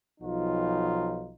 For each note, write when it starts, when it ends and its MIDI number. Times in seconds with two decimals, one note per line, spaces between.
0.21 1.34 35
0.21 1.34 53
0.21 1.34 63
0.21 1.34 65